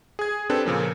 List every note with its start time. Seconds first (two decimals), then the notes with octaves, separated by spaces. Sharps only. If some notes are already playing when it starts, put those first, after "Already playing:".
0.19 G#4 G#6
0.50 C4 D4 G4 A4 B4
0.65 A#2 C#3 F3 A#3